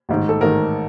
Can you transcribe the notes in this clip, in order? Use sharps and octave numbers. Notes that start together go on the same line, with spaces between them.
A1 G#2 D#3
A4
A1 G#2 D#3 A#4